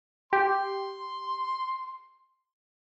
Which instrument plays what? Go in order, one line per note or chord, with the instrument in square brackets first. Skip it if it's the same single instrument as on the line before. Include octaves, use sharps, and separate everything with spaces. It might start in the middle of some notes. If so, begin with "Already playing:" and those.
[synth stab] G4 [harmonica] C6